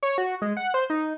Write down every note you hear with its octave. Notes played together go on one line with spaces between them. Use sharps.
C#5
F#4
G#3
F#5
C5
D#4